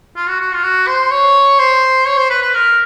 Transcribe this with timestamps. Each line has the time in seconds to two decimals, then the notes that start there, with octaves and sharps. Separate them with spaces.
0.16 F4
0.28 F#4
0.40 F#4
0.53 F4
0.63 F#4
0.87 C5
1.11 C#5
1.59 C5
2.06 C#5
2.17 C5
2.30 B4
2.42 B4
2.54 A#4